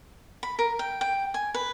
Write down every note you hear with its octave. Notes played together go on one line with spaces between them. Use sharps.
B5
A#4
G5
G5
G#5
B4